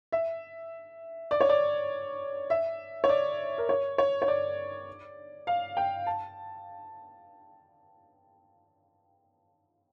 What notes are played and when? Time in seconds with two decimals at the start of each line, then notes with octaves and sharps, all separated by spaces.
0.12 E5
1.31 D5
1.41 C#5
1.49 D5
2.50 E5
3.04 C#5
3.09 D5
3.58 A#4
3.69 C#5
3.98 C#5
4.22 C#5
4.28 D5
5.47 F5
5.77 G5
6.07 A5